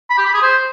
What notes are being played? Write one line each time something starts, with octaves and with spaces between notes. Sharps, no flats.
B5
G4
B5
G#4
C5